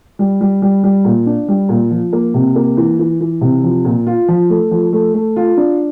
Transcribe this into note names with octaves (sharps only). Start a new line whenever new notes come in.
G3
G3
G3
G3
A#2
D4
G3
A#2
F3
A#3
C3
A#3
E3
E3
E3
C3
F3
A#2
F4
F3
A3
F3
A3
A3
F4
D4